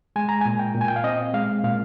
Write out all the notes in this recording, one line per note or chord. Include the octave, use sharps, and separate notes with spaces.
G#3 G#5
A#5
G#5
A#2
G5
A#2
G#5
G5
F5
C4 D#5
G#3 F5
A#2 F5